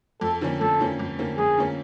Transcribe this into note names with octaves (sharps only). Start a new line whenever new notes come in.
F2 A4
D3 F3 A#3 C#4
F2 A4
D3 F3 A#3 C#4
F2
D3 F3 A#3 C#4
F2 G#4
D3 F3 A#3 C#4